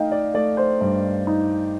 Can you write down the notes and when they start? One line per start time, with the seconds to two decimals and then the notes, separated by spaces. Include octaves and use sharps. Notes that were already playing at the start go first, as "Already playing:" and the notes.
Already playing: A3 D#4 D#5 F5 G5
0.12 D5
0.34 A3 D5
0.57 C5
0.81 G2
1.27 D#4